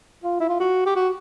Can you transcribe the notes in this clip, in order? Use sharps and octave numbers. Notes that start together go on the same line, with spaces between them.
F4
E4
F4
F#4
G4
F#4